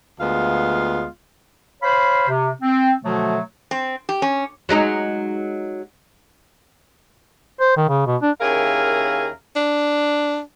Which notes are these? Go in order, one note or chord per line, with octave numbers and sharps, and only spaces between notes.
D2 G#3 B3 F4 F5
C5 C#5 F5 B5
C3
C4
B2 D3 F3 F#3 A3
C4
G4
C#4
F#3 G#3 D#4
C5
D#3
C#3
B2
D4
D#2 C#4 E4 G#4 A#4 F5
D4